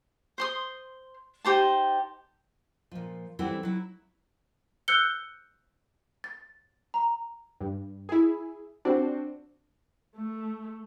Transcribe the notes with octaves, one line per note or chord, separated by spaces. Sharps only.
C5 C6 D#6
D#4 G4 C5 A5
A#2 F3
E3 G3 C4 E4 A4 F#5
F#3 E4
E6 F#6 G6 C#7 G7
A6
A#5
G2
E4 G#4
C4 D4 F#4 C5
A3